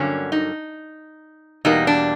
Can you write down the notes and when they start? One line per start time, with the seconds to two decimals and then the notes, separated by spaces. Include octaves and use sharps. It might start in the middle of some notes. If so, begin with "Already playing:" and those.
Already playing: G2 D3 F#3 A#3 C#4
0.32 D#4
1.65 E2 B2 G3 A#3 D#4
1.87 D4